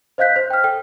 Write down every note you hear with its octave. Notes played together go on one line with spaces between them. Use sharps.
C5 D#5 F5 F#6 G6 B6
C5
G5 F6
A4 G5